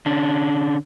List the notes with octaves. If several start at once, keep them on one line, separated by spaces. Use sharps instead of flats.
D3 C#4 D4